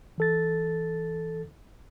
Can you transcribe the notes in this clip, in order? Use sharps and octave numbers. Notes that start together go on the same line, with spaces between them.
E3 A4 A6